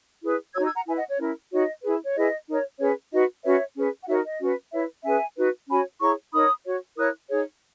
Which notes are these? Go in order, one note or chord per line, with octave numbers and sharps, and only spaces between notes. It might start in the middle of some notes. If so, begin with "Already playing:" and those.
E4 G#4 B4
D#4 F#4 C#5 E6 G#6
E6 G#6
F#5 A#5
E4 B4 E5 G#5
D#5 F#5
C#5
C#4 E4 A#4
D#4 F#4 C#5 D#5
E4 G#4 B4
C#5
E4 G#4 B4 D#5
D#4 A#4 C#5
C#4 G#4 B4 C#5
D#4 F#4 B4 D#5
C#4 F#4 B4 C#5 E5
C#4 G#4 B4
F#5
D#4 F#4 A#4 C#5 E5
D#5
C#4 F#4 B4
E4 B4 C#5 E5
C#4 G#4 B4 E5 G#5
D#4 F#4 B4
C#4 F#4 C#5 G#5 B5
E4 G#4 C#5 A#5 C#6
D#4 A#4 C#5 B5 D#6
F#4 C#5
E4 A#4 C#5 D#6 F#6
D#4 G#4 C#5